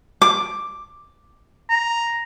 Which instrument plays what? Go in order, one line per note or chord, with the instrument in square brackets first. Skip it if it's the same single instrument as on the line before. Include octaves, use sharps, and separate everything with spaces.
[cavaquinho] D6
[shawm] A#5